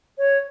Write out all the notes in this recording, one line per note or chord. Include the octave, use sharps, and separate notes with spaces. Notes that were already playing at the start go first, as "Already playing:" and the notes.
C#5